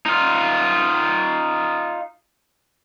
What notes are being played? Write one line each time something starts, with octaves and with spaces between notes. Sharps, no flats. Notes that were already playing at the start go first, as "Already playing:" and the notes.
D#4 F4